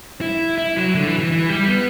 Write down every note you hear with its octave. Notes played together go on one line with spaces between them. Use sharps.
E4
E4
F#3
D3
E3
E3
E3
G3
B3